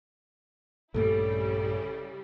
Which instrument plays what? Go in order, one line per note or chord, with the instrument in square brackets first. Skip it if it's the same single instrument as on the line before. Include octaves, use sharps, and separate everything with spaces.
[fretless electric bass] A#1 G2 A3 [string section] C#3 G3 E4 [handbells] A4